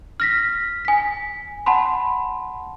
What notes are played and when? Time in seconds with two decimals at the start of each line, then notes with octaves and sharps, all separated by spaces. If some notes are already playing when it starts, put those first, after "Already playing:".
0.20 F6 A#6 B6
0.85 G#5 B6
1.66 F#5 A5 B5 C6